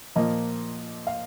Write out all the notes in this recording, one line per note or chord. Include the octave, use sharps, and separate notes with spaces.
A#2 F3 A#3 D#5
F5